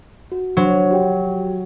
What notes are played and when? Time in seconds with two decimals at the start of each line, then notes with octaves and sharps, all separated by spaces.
0.32 F#4
0.57 F#3 D4 C5 C6
0.91 F#4 G4 G5